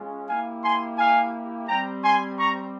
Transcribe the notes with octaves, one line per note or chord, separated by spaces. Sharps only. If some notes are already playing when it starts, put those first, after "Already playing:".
Already playing: G#3 C#4 F4
A#3 E4 G4 F5 G#5
G#5 C6
F5 G#5
G3 C4 G4 G5 A#5
G#5 C6
A#5 C#6